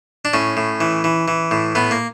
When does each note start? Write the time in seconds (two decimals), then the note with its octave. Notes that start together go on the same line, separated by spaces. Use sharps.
0.25 D4
0.33 A2 C#4
0.57 A2
0.81 E3
1.04 E3
1.28 E3
1.51 A2
1.75 A2 B3
1.91 A#3